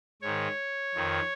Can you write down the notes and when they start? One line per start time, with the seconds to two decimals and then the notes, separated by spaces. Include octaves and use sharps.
0.22 G#2 D#3 C#5
0.95 F2 D#3